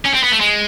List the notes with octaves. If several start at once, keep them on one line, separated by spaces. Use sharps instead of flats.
C#4
C4
B3
A3
G#3